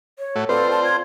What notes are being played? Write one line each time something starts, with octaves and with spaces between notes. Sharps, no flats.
C#5
A2 A3 F#4
C4 F4 A4 B4 C5 D5
A5
G#6